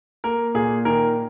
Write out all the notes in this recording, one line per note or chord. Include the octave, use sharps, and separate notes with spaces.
A#3 A#4
A#2 G#4
D#3 A#4